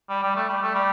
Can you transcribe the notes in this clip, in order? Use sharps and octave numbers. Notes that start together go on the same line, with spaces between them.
G3
G3
A3
G3
A3
G3